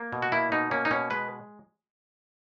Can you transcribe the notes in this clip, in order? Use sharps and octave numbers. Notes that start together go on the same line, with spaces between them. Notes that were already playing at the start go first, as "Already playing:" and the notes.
Already playing: A#3
B2
F#4
A#3 E4
B2 D#4
A#3 C#4
D#4
B2 C#4
G#3 B4